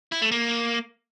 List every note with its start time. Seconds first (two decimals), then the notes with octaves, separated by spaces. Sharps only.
0.12 E4
0.22 A3
0.32 A#3